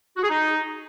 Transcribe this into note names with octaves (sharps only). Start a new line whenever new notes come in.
F#4
G#4
D#4